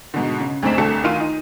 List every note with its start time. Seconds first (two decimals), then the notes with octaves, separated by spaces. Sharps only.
0.14 G#2 B2 D3
0.40 C#3
0.63 D2 G#2 C4 D4 B6 E7
0.78 C2 D3 A3 A4 C#7
1.04 D2 D#3 F4 C6 D#7
1.20 D#4